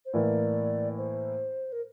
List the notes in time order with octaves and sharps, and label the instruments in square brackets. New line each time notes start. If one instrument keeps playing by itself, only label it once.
[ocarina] C5
[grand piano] A2 E3 A#3 E4 [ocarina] D5
[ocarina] C5
A#4